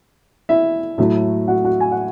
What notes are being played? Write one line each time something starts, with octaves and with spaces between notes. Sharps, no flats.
E4 E5
A2 F#3 A3
F#4 F#5
F#4 F#5
G#5
F#5